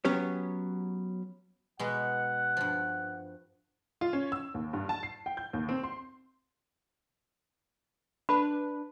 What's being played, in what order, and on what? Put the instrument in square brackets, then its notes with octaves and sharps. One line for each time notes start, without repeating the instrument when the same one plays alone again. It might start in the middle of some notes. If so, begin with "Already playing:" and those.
[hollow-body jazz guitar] F#3 B3 C#4 G4 C#5
[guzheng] B2 G#3 B3 [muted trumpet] F#5
[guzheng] G2 F3
[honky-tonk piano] F4
C#4
E6
D#2
G2
A5
C7
G5
G6
D#2
C4
C6
[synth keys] D4 B4 [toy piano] B5